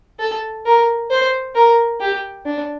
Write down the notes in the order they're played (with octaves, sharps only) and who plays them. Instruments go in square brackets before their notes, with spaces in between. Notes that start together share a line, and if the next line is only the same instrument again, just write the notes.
[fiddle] A4
A#4
C5
A#4
G4
D4